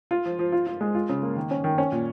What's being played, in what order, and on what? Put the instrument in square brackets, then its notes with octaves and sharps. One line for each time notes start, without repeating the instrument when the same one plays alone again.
[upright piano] F4
F3
F3
F4
F4
G#3
F4
C#3
A#3
D#3
C#4
D#3
C#4
A#2